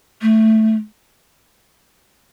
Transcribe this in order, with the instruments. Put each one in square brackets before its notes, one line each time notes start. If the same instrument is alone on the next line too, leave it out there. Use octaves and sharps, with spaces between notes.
[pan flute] A3